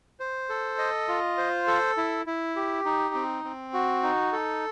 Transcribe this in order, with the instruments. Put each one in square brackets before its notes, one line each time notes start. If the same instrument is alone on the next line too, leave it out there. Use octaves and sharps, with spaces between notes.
[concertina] C5
A4
D#5
F4
C5
A4
E4
E4
G4
D#4
C4
C4
F#4
D#4
A4